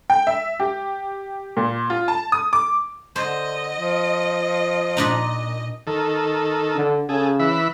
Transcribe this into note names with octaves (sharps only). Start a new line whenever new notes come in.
G5
E5
G4
A#2
F4
A5
D#6
D6
D3 C5 D#5
F3
A#2 D4 D#4
D#3 A4
D3
C#3 G#4 A4
E3 E5 B5